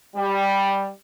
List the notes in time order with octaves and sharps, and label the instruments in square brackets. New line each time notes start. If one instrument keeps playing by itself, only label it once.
[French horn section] G3